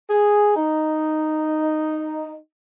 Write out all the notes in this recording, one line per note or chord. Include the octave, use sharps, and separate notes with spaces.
G#4
D#4